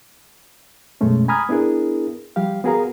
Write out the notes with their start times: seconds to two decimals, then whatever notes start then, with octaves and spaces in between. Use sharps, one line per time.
1.01 F#2 B2 G#3 A3 C#4
1.28 G#5 A#5 B5 D#6 F6 G#6
1.49 B3 D4 E4 G#4 A#4
2.36 F3 G3 G4 F5
2.64 B3 F#4 G#4 A#4 F5 A#5